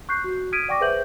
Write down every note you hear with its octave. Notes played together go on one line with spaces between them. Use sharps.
C#6 F#6 G6 C7
F#4
D#6 F6 G#6 B6 D7 D#7
D5 F#5 G5 C#6 D6 A#6
G#4 B4 C5 E5 G6 F#7